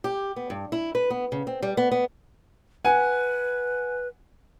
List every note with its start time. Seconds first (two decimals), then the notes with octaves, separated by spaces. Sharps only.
0.04 G4
0.36 B3
0.50 G2
0.72 E4
0.95 B4
1.10 B3
1.32 C#3
1.47 C4
1.62 G3
1.77 B3
1.91 B3
2.85 B4 F#5 G#5